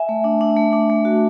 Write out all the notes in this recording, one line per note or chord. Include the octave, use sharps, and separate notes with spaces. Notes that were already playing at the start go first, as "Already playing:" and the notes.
Already playing: E5 G#5
A3
D4
D4
A3
D4
A3
F#4